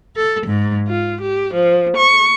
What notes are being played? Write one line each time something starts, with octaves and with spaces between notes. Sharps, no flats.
A4
G#2
F4
G4
F3
C#6